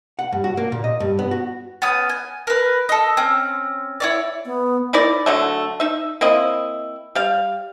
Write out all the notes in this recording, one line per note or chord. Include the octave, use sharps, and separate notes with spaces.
F#5
G2
F#4
A#3
A#2
D#5
G2
B3
F#4
B3 C#4 D#6
G#5
A#4 B4
A4 D#5
C4 C#4
E4 C#5 D5
B3
D#4 E4 A#4 D5
D3 F#3 A3
D#4 E5
A#3 C4 E4 D#5
G3 F5